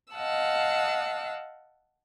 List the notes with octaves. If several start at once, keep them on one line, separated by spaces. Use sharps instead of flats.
D#5 F5 F#5 A5 E6